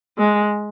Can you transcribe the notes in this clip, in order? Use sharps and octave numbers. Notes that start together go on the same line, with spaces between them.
G#3